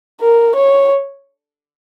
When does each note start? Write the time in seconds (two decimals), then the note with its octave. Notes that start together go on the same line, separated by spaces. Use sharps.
0.21 A#4
0.55 C#5